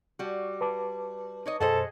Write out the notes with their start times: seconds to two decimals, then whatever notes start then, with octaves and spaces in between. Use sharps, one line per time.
0.19 G3 F#4
0.61 B4 A5 D6
1.46 D#4 C#5 D#5
1.60 F#2 B2 G#4 A4 C5 D#5 F#5